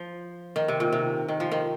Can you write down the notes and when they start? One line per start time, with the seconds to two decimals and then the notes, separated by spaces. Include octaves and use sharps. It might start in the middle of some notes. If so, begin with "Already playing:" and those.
Already playing: F3
0.56 D#3
0.68 C3
0.80 A#2
0.92 C3
1.28 D#3
1.40 F3
1.51 D#3